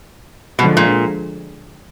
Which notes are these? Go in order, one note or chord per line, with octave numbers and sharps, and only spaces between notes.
B2 D3 F3 G#3
A#2